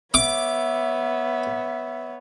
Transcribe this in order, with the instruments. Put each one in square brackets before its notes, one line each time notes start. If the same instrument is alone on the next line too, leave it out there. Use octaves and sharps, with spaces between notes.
[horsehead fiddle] B3 C#5 [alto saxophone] E5 [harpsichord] D6